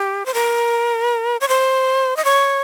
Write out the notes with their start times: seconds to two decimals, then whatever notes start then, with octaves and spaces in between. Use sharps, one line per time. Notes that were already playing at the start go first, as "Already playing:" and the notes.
Already playing: G4
0.26 C5
0.34 A#4
1.41 C#5
1.48 C5
2.16 D#5
2.25 C#5